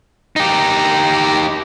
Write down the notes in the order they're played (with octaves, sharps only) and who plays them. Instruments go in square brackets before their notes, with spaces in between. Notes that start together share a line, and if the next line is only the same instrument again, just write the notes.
[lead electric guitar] D#4 G4